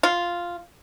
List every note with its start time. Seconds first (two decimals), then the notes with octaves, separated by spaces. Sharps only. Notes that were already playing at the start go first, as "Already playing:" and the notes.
0.03 F4